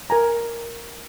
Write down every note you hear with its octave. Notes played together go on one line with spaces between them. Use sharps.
A#4 G#5 A#5